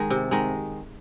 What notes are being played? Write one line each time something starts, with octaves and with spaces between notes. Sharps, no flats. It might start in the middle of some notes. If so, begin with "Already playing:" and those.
Already playing: D#3 G#3
C3
D#3 G#3